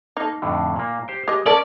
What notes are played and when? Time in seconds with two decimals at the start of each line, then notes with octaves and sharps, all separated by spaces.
0.17 A#3 D#4 A4
0.42 F2 A2 D3
0.76 A#2 A#3
1.08 G4 C5 G5
1.28 G#3 G4 D#5
1.46 C#4 A4 A#4 D5 A5